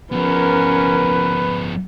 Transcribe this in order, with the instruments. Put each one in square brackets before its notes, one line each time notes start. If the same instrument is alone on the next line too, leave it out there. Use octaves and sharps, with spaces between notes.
[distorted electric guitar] F3 B3 [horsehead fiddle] C#4 A#4 [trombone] B4